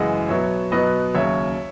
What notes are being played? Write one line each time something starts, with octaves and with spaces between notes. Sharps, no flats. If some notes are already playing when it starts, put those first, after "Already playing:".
Already playing: F#2 C#3 E3 G#3 D#5 F#5
B2 F#3 B3 C#5 E5
B2 F#3 B3 B4 D#5
D#2 C#3 F#3 C#5 E5